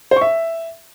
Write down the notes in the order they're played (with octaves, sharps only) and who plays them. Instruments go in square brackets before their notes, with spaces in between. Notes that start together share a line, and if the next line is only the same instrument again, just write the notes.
[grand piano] C5
C#6
E5